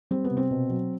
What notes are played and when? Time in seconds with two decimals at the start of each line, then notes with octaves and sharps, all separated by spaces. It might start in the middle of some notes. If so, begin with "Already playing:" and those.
0.11 G3 C4
0.24 B3
0.31 C3
0.37 C4
0.50 B2
0.70 F#3